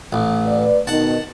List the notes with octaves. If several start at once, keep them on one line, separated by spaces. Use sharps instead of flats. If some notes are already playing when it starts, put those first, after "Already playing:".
A1
B4 D5
B2 D#3 F#5 A5